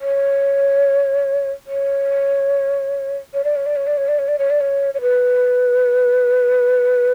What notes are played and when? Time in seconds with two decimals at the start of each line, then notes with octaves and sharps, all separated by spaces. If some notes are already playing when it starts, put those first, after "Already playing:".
0.01 C#5
1.67 C#5
3.34 C#5
3.44 D5
3.56 C#5
3.66 D5
3.76 C#5
3.87 D5
3.97 C#5
4.08 D5
4.19 C#5
4.28 D5
4.39 C#5
4.50 D5
4.60 C#5
4.94 C#5
5.01 B4